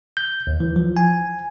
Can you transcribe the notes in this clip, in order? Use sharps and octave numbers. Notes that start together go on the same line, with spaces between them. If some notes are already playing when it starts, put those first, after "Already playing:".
G6
D#2
E3
F3
G#5